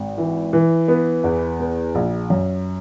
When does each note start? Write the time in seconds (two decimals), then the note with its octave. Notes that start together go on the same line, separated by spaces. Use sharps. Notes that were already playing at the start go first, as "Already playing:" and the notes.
Already playing: G#1
0.18 E3
0.53 E3
0.88 B3
1.24 E2
1.60 B3
1.95 A#1
2.30 F#2